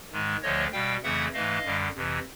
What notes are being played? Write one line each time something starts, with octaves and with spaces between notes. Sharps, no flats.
G#2 D#3 G#3
D2 D3 F3 A3 C#5 D#5
B2 G3 F5 G5
F2 C#3 E3 A3 E5 F#5
G#2 E3 A3 D#5 F5
F#2 D3 G3
F2 C3 E3